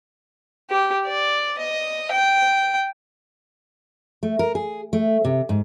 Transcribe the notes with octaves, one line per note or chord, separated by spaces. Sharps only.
G4
D5
D#5
G5
A3
A#4
G#4
A3
C3
G#2